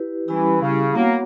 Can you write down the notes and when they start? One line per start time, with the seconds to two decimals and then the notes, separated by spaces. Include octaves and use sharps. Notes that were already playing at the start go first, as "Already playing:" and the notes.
Already playing: E4 G4 B4
0.28 E3 G3 C#4 E4 G4
0.61 C#3
0.95 A#3 B3 F#4 C#5 F#5